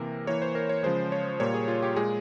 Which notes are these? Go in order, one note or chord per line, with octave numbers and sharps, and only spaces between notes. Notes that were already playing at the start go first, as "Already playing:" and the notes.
Already playing: C3 E3 A#3 A#4
E3 A#3 C#5
C5
A#4
C#5
C#3 F3 G#3 C5
C#5
A#2 G3 A#3 C#5
G#4
F4
G4
A#2 G#3 G#4